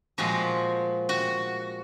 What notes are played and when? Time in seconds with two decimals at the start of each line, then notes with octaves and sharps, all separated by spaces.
0.18 A#2 F3 G#3 F#4
1.09 F#4